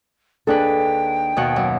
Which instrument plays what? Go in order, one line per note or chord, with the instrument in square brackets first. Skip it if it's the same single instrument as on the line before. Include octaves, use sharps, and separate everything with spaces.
[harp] D#2 B4 [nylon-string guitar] D4 G#4 A4 [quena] G5
[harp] D#2 B2 F#5
F#2